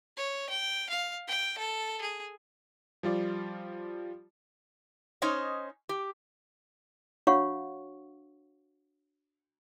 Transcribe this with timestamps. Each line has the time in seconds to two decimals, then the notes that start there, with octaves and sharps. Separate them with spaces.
0.17 C#5
0.49 G5
0.89 F5
1.28 G5
1.58 A4
2.01 G#4
3.03 F3 G3 F4 D5
5.22 C#4 D#4 C5 C#5 D#5
5.89 G4
7.27 D4 F#4 C#5 F5 F#5 C#6